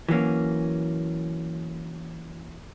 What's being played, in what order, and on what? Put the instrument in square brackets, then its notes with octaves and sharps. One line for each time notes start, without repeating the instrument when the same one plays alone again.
[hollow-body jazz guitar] E3 F#3 A#3 C#4